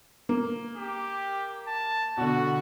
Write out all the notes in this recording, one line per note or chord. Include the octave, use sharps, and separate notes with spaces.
A#3
G4
A5
B2 D3 F#4